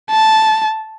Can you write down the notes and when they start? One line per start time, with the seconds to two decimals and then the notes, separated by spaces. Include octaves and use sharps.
0.10 A5